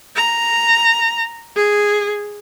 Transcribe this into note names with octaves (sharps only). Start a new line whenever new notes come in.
A#5
G#4